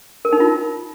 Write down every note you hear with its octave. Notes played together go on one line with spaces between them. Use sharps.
A#4
D#4
F4